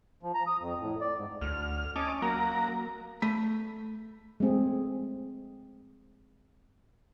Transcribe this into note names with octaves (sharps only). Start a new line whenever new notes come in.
F3
A#5
D#6
F2
A2
D5
G#2
D2 F6
C#4 D#5 A5 D6
F#3 A#3 A#4 A#5
A3 B5
G#3 A3 C4 G#4